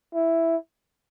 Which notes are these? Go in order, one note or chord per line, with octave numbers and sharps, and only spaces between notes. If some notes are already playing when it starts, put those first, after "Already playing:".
E4